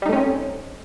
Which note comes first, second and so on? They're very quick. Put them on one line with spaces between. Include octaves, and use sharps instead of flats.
G3 D#4 A3 C#4 C4